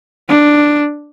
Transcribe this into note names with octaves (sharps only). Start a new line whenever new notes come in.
D4